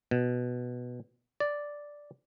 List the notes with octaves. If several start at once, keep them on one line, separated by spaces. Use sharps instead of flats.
B2
D5